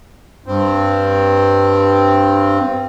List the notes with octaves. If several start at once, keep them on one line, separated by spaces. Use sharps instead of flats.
G2 C4